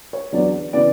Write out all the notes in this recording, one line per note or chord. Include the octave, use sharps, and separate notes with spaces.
C#5
E2 D3 F#3 B3 D5
C#3 E3 B3 D5